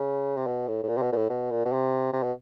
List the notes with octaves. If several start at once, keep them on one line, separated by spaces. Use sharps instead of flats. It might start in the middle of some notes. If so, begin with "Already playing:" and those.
Already playing: C#3
C3
B2
A2
A2
A#2
C3
B2
A#2
A2
B2
A#2
B2
C3
C3
B2